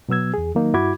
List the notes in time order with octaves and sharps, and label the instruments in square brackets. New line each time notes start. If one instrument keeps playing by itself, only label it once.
[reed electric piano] B2 F#3 B3 E6 G#6
E2 G#4
D#3 F#3 A#3 D#4
G2 E4 F#4 B5 D6 G#6